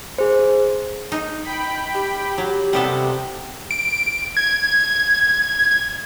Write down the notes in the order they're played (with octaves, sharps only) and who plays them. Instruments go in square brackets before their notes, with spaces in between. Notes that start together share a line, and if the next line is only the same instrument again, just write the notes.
[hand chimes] G#4 C5
[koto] D#4
[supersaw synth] G5 B5
[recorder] G4
[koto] F#3
[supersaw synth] C3 [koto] G3 B3 A4
[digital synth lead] D7
G#6